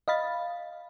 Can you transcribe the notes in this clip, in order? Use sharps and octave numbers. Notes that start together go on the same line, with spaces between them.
D#5 F5 B5 A6